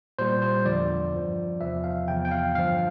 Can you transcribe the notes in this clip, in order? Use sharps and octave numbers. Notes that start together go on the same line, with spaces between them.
A#2 G3 C5
C5
E2 D3 F3 D5
G2 F3
E2 C3 F3 E5
F5
E2 C3 F3 G5
G5
F5
G2 D3 F3 F5